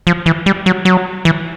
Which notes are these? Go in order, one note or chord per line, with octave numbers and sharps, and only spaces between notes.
F3
E3
G3
F#3
F#3
E3